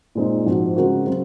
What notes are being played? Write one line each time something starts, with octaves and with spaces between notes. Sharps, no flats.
A#2 G#3 C4 D#4
G#2 F3 C4 F#4
C#3 G#3 C4 F#4 A#4
C#3 F#3 C4